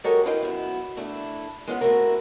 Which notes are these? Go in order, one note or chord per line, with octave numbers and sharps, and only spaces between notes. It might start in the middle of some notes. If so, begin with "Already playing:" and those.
F#3 G#3 G4 A4 A#4 C#5
E4 F4 B4 D#5 F5 G5
F#2 B3 E4
A3 D4 E4
G#3 B3 C#4 F4 C#5 F#5
A3 C4 E4 F#4 A#4